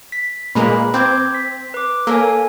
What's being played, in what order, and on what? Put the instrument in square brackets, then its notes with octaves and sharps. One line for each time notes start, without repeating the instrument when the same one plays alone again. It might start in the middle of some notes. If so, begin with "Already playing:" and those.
[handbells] B6
[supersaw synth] A#2 G#3 A#3 [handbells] B4 A#5 B5
[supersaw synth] C4 [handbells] D6 G6 G#6
[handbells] B6
B4 D6
[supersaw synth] A#3 [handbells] A4 C#5 G#5